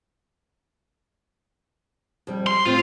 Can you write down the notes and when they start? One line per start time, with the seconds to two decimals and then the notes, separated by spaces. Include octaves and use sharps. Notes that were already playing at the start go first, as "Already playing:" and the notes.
2.27 F2 G3
2.47 C6
2.65 A2 C4 F4